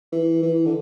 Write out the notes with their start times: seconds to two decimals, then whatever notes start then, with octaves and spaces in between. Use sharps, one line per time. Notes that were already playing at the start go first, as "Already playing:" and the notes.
0.12 E3
0.42 E3
0.66 D3